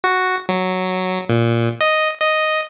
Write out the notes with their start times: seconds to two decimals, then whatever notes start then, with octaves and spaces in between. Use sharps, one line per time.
0.04 F#4
0.49 F#3
1.29 A#2
1.81 D#5
2.20 D#5